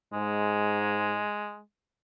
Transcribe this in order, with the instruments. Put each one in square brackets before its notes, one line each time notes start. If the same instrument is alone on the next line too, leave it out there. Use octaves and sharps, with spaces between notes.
[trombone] G#2 [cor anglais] G#3